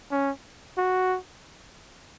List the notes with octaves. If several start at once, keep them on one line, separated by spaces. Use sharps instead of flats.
C#4
F#4